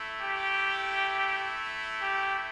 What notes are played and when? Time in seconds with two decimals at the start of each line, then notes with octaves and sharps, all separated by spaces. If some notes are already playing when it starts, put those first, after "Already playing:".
Already playing: A3 E4
0.23 G4
2.02 G4